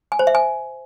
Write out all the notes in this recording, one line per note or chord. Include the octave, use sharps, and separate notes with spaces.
G#5
C5
E5
G#5